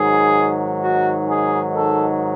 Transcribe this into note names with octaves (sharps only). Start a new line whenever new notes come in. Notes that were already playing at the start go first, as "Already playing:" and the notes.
Already playing: G#2 D#3 F#3 G#4
F#4
G#4
A4